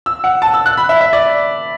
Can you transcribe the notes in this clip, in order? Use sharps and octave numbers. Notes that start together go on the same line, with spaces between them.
E6
F#5
A5
E6
F#6
B5
E5
E5
D5